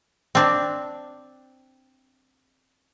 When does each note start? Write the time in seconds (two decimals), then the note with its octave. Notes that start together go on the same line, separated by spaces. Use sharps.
0.35 C4 D4